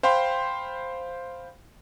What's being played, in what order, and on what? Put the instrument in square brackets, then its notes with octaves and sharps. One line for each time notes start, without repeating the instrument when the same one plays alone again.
[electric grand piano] C5 F5 G5 B5 C6